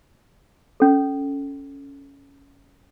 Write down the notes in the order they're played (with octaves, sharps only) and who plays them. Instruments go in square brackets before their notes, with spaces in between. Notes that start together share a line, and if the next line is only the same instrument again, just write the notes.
[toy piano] C#4 A4